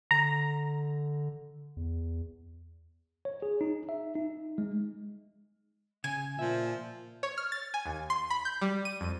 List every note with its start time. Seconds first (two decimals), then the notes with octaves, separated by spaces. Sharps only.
0.11 D3 A#5
1.77 E2
3.25 C#5
3.42 G#4
3.61 D#4
3.89 E5
4.15 D#4
4.58 G#3
6.04 C#3 G#5
6.39 A#2 F3 E5
7.23 C#5
7.38 F6
7.52 A6
7.74 G#5
7.86 D#2
8.10 C6
8.30 B5
8.45 G6
8.61 G3
8.85 D#7
9.01 F2